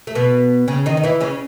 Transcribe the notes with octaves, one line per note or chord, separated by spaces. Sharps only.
A3
B2 B3
C#3 C#4
D#3 D#4
D#4
E3 E4
C#3 C#4